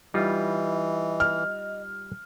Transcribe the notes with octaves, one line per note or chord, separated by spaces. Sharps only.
E3 G3 D#4 F4 D#5
F6